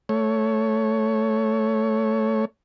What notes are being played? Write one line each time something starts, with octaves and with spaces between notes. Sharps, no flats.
A3 C#5